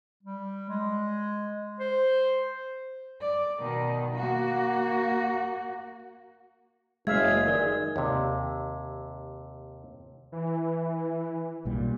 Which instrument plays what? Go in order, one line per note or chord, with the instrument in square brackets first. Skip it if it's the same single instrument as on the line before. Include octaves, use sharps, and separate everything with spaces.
[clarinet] G3
G#3
C5
[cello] D5
B2 D#3
A#3 F#4
[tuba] F#1 [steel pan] G#3 E5 F5 [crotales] G#6
[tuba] D#3 [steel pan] G#4 [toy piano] A#4 D5
[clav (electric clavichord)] D#2 C3
[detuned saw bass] E3
[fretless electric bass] B1 A#2 G3